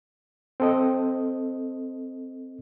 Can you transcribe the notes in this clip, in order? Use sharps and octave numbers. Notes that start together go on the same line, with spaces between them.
C4 A4 D#5